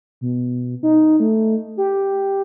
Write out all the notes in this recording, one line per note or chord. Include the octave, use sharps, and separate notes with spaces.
B2
D#4
A3
G4